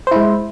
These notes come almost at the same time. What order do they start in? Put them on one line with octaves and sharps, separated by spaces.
C5 E4 G#3